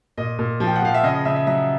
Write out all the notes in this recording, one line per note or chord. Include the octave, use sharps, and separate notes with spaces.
A#2 D#5
A#2
F3
G5
F#5
F3 F5
E5
C#3 D#5
D#5
C#3 E5
E5
F#3 E5